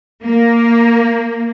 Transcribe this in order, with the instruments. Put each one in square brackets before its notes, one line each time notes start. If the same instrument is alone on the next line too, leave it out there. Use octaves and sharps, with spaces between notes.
[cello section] A#3